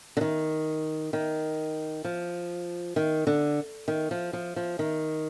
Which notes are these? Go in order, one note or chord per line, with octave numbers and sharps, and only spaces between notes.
D3
D#3
D#3
F3
D#3
D3
D#3
F3
F3
F3
D#3